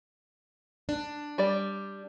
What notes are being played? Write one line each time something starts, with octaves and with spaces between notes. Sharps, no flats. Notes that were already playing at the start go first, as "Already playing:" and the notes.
D4
G3 D5